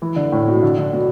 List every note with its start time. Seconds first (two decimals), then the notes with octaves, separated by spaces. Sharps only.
0.02 E3
0.16 D3
0.32 A2
0.47 B2
0.63 D3
0.78 D3
0.93 B2